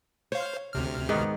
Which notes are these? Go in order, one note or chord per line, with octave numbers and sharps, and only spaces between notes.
C5 C#5 F5
D2 C3 F6
G#2 D#3 B3